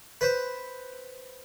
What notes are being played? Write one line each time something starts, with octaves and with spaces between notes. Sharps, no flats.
B4 C5